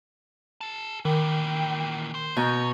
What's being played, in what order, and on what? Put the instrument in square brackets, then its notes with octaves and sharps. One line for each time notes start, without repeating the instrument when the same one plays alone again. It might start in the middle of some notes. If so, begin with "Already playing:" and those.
[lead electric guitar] G#4 A5
[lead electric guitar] A#2 E3 [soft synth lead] D#3 [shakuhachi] G5
[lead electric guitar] C5
[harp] B2 [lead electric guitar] C#4 [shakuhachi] A#5 [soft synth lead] G6